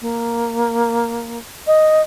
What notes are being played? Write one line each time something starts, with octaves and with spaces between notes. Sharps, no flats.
A#3
D#5